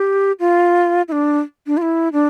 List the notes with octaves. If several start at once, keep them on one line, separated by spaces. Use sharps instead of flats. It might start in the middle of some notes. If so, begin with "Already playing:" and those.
Already playing: G4
F4
E4
D4
D4
F4
E4
D4